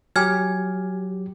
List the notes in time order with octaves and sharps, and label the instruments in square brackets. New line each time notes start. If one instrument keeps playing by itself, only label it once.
[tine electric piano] F#3 G4 [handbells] G#5 F6 G#6